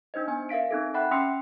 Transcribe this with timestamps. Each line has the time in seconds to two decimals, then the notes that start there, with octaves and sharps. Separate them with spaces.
0.14 D4 D#4 C5 D#5
0.27 B3 G#5
0.49 A#4 E5 F5 B6 D7
0.71 C4 D#4 A4
0.94 E5 F#5 G5 B5 F#6
1.11 C#4 G5 C6 E6 B6 C#7